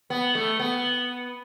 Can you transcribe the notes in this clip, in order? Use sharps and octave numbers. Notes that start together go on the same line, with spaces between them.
B3
A3
B3